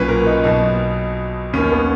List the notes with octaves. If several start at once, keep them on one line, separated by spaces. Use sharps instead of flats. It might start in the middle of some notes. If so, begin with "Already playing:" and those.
Already playing: B1 A#2 B3 C#4 B4
A#4
D#4
B1 B2 D#4
D#2 D#3 C#4
B3